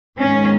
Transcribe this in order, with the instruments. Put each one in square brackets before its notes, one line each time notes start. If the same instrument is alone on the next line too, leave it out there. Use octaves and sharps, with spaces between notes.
[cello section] G#2 D#3 G#3 B3 C#4